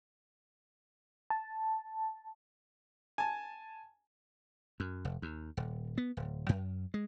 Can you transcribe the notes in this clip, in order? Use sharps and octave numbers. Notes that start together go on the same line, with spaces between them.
A5
G#5 A5
F#2
F1
D#2
D#1
B3
D1
F#2
G#3